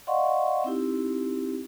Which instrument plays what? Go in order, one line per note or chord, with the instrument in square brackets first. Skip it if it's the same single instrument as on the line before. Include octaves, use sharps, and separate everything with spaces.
[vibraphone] D5 D#5 F5 F#5 C6 C#6
C4 D#4 E4 G4